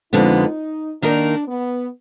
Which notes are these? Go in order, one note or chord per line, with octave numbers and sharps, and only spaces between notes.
F2 D3 G#3 B3 D#4
D#3 A#3 D4 D#4 A#4
B3